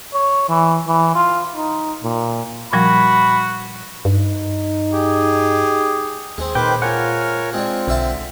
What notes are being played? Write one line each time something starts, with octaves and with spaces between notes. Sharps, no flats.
C#5
E3
E3
F4
D#4
A#2
A#2 F3 G3 F#4 B5
G2 D#4
G4 G#4
D#2 G#3 C4
A#2 D#3 B4 C5 G5 D6
F4 A#4 C#5 F#5 G#5
G#3 C4 D4
B1 D3 E5 A5